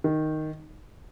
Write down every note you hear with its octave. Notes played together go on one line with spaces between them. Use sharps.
D#3